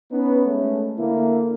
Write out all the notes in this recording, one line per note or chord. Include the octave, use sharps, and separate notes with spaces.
B3 C#4 D#4 B4
G#3 A3 C#4
D3 A#3 E4